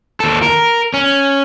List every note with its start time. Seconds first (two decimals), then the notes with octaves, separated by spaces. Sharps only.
0.20 D#2 A4
0.42 A#4
0.94 C#4